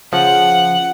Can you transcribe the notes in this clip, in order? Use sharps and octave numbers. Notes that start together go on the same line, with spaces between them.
C#3 F3 F#5